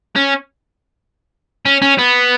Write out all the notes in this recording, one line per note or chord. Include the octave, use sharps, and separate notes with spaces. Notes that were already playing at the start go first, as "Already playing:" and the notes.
C#4
C#4
C#4
B3